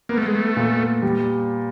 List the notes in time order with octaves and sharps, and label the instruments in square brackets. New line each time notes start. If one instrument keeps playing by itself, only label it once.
[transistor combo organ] A#3 [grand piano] B3
[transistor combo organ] A3
G#3
A3
[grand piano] A#2
G3